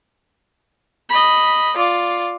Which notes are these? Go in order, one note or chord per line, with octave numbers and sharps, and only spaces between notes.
D#5 B5
F4 D5